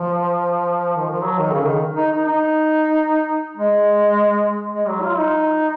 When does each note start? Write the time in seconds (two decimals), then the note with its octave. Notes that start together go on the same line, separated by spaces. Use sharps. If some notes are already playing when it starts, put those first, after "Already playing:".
Already playing: F3
0.97 D#3
1.10 F3
1.23 F#3
1.38 D#3
1.52 C#3
1.67 D#3
1.96 D#4
2.11 D#4
2.25 D#4
3.57 G#3
4.74 G#3
4.88 F#3
5.03 F4
5.18 D#4